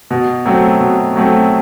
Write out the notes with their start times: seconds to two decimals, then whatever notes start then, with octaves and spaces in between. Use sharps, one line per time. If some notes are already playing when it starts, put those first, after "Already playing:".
0.11 B2
0.46 F#3 A3 C4
0.80 B2
1.16 F#3 A3 C4